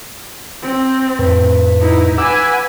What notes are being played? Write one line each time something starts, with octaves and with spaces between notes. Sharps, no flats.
C4
F2 A2 B4
D#4 E4
B4 F#5 G#5 D6 E6